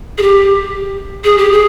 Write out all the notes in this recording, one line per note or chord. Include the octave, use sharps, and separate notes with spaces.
G#4
G4
G#4
G4
G#4